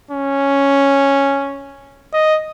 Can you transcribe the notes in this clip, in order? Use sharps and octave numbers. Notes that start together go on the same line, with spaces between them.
C#4
D#5